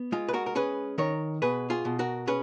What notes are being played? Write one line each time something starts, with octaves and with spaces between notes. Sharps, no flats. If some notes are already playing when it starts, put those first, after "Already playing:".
Already playing: B3
G#3 F4
B4
F#4 A#4
A#4
C#4 G#4 B4
D#3 A#4 C#5
B2 G#4 B4
F4 G#4
B2
F#4 A#4
C#4 G#4 B4